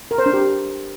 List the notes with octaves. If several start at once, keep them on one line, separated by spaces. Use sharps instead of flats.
A#4
C5
D4
G4